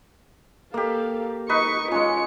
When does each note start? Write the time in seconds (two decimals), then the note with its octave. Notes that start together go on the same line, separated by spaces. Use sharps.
0.74 A#3 G4 A4 F5
1.49 D#4 B4 C#6 C#7
1.92 G#3 C#4 F4 C#7